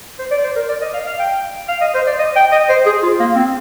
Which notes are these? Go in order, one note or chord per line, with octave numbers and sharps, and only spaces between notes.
C5
D5
C5
A#4
D5
D#5
F5
F5
G5
F5
D#5
C5
D5
D#5
G5
D#5
C5
G#4
F4
A#3
C4